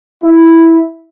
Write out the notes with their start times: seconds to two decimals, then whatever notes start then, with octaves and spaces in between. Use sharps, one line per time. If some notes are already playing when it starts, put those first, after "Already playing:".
0.23 E4